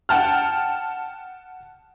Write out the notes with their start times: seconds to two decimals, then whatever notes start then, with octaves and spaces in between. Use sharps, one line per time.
0.09 F#5 G5 A5 F6